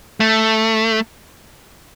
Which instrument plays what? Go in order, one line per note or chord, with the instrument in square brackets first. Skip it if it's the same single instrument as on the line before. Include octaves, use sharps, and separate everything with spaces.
[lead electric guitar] A3